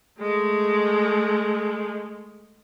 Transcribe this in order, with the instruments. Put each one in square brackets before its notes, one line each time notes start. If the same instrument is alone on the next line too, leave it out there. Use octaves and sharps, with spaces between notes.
[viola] G#3 A3